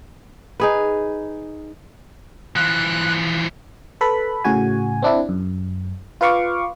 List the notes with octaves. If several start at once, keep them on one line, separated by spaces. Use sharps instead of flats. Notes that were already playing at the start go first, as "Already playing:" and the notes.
D#4 G#4 B4
E3 F3 F#6
A4 B4 B5
A2 C#3 F#4 G#5
C4 D4 E4
F#2
F4 B4 F5 C#6 D6